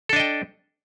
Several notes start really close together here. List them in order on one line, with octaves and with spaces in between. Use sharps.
A4 D4 D#5 G5